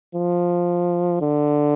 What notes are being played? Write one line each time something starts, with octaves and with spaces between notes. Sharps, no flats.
F3
D3